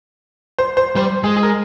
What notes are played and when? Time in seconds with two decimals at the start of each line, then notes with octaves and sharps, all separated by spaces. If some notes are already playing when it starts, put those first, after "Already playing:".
0.58 C5
0.77 C5
0.96 G3 C5
1.24 G#3 G#4
1.36 G#4
1.43 A#4